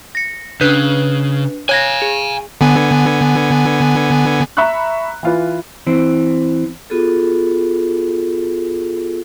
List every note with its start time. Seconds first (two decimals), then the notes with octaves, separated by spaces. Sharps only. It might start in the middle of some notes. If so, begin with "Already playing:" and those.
0.15 A#6 C#7
0.61 C#3 D4 B4 F#6
1.69 C#5 F5 G#5 G#6 A#6
2.02 G#4
2.61 D3 B3 G#5
4.57 E5 A#5 B5 C#6 F#6
5.23 E3 F4 B4
5.87 E3 C4
6.90 B3 F4 F#4 G#4 A4